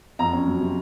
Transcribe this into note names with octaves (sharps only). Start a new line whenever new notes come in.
F2 A#5
C#4
F#3
C3